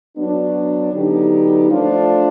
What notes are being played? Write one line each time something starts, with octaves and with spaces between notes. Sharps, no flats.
F#3 B3 D4
D3 F#3 B3 D#4 G4
F3 A3 D4 F4